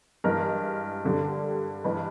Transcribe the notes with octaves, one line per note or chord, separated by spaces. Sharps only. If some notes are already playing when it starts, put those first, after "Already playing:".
G2 E3 G#3 A#4
G2 D3 G3
G2 E3 G#3 B4